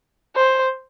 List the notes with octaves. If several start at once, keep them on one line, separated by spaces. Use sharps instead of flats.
C5